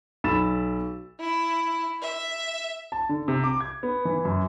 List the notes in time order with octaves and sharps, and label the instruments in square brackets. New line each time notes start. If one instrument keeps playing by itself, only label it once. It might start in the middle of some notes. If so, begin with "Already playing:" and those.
[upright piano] B1 B5 E6 A6 E7
[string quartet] E4
E5
[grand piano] A5
D3
C3
D6
G#6
B3
E3
F#2